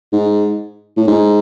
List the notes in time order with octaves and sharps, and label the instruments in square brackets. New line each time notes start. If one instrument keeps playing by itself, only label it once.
[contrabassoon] G#2
A2
G#2